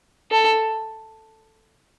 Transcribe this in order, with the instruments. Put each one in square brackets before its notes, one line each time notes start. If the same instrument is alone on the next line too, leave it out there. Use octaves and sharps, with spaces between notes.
[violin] A4